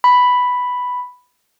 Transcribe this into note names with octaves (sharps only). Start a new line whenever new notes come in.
B5